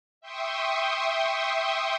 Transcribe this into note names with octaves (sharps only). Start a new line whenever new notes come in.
E5 G5 C6 C#6 D#6